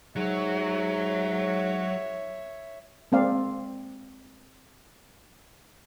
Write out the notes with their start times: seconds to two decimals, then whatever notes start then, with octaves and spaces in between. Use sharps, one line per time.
0.16 G#2 F#3 C#5 E5
3.12 G#3 A#3 C4 D5 F5